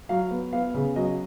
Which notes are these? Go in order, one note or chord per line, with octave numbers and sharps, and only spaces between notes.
F#3 F5
B3
B3 F5
C#3
F#3 D#5